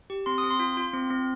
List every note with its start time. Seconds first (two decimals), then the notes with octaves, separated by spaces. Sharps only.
0.10 G4
0.26 C4 C6
0.38 D#6
0.43 C4
0.50 C6
0.60 F4
0.77 F4
0.93 C4
1.10 C4